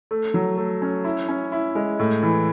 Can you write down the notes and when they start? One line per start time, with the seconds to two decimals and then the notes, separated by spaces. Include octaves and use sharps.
0.11 A3
0.34 F#3
0.57 A3
0.82 C#4
1.04 E4
1.28 C#4
1.52 E4
1.75 G#3
1.99 A2
2.23 E3